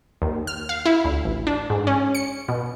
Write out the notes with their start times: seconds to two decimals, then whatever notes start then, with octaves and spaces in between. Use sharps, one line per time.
0.22 D#2
0.47 F6
0.69 F5
0.86 E4
1.04 D2
1.25 A1
1.47 D4
1.70 G#2
1.87 C#4
2.14 C#7
2.48 B2